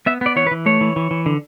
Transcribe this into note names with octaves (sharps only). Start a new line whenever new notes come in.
B3 E5
B3 D5
E3 C#5
B4
E3
A3 C#5
E3
E3
E3
D3